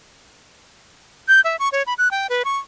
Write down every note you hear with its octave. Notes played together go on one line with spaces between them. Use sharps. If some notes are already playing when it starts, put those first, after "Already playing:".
G6
E5
C#6
C#5
B5
F#6
G5
B4
C#6